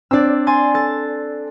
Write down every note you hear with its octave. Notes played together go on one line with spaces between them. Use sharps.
C4 D4 D5 E6
G#5 C6 A6
A4 A6